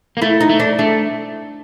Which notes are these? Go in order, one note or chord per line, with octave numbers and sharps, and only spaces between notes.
A#3
A3 E4
D#4
A3
D4
A3 D4